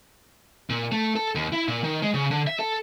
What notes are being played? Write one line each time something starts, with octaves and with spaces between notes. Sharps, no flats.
A#2
A3
A4
D#2
E4
A#2
D#3
G#3
C#3
D3
E5
A4